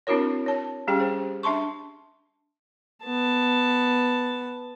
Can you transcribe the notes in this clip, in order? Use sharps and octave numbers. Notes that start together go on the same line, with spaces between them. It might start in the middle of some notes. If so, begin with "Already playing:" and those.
C4 D4 E4 F#4 A#4 C#5
C#5 A5
G3 C#4 G4 G#4 G5
G#4 C5
D4 E5 A5 C6 C#6
B3 A5